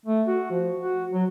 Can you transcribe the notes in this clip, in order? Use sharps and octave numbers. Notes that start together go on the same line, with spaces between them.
A3
F#4
F3
F#4
F#3